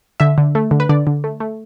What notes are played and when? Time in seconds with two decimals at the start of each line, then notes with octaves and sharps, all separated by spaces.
0.20 D3 E5
0.38 D3
0.55 A3
0.71 D3
0.80 B4
0.89 D3 D5
1.07 D3
1.24 A3
1.40 A3